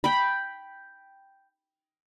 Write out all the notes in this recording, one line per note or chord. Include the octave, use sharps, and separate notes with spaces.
G5 B5